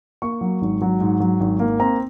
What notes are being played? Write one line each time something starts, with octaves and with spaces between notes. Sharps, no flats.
A#3 C#6
F#3
G#1
F#3
G#2
F#3
G#1
A#3
C4 A#5